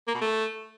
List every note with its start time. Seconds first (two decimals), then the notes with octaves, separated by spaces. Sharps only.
0.08 A#3
0.14 B2
0.21 A3